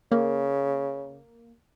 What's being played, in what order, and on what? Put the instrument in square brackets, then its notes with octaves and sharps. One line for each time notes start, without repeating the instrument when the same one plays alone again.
[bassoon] C#3 [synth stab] A#3